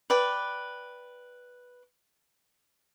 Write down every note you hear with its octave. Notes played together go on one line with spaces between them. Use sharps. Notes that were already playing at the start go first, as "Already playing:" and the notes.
B4 D5 G5